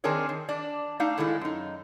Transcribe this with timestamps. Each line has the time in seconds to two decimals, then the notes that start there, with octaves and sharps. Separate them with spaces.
0.04 D#3 C4 D4 G#4 A#4 C#5
0.29 D#3
0.49 D4 D5
1.00 A3 D4 D#4 F5
1.18 A2 D#3 G#3 A3 E4
1.41 F#2 D#4